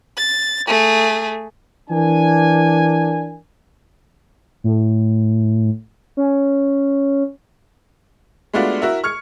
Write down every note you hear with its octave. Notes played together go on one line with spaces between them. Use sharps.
A6
A3 G#4
E3 D4 A#4 G#5
A2
C#4
G#3 A3 B3 D4 F4 F#4
E4 F#4 A#4 E5
C#6 F6 G#6 C#7